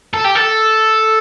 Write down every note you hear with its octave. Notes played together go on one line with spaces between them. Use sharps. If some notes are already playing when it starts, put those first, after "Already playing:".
A4
G4
A4